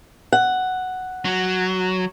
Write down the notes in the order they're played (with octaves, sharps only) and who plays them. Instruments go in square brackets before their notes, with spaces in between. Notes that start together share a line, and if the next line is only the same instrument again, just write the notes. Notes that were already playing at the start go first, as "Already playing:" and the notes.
[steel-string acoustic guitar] F#5
[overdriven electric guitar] F#3